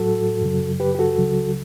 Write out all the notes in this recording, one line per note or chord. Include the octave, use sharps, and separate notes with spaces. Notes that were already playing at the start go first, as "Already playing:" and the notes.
Already playing: A2 F#3 F#4 A4
F#2 C#3 F#3
G4 B4
G4
F#4 A4
C#2 C#3 F#3